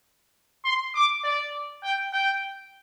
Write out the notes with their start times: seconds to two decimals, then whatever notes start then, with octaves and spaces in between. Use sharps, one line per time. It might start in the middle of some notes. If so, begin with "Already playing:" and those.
0.65 C6
0.95 D6
1.24 D5
1.83 G5
2.13 G5